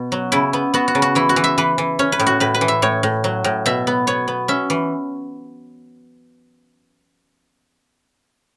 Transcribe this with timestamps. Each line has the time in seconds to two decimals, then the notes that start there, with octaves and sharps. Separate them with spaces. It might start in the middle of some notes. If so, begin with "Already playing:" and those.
Already playing: B2 B3
0.12 F#3
0.32 C#3 E4
0.53 B3
0.74 B3 F#4
0.88 F#4
0.95 C#3
1.02 F#4
1.15 E3 E4
1.29 F#4
1.36 E3
1.44 E5
1.58 E3 B4
1.78 E3
1.99 C#4 C#5
2.12 B4
2.19 A2
2.26 F#4
2.40 A2 B4
2.54 B4
2.61 E3
2.68 E5
2.82 A2 C#5
3.03 A2
3.24 F#3
3.44 A2
3.66 B2 E5
3.87 B3
4.07 B3 C#5
4.28 B3
4.48 C#4 E5
4.70 E3